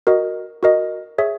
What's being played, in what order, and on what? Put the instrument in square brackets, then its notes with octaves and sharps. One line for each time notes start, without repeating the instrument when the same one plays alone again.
[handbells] F#4 A#4 D#5
F#4 A#4 D#5
G#4 C#5 E5